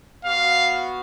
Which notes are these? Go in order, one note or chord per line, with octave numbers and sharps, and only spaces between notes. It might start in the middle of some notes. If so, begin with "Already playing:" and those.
B3 F#4 F5